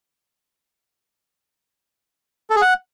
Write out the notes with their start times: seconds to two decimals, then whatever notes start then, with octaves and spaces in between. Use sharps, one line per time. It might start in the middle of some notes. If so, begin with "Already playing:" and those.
2.50 A4
2.56 G#4
2.62 F#5